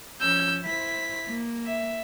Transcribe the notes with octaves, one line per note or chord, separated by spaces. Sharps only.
F3 C#4 E6 G6
E4 C5 B6
A#3
E5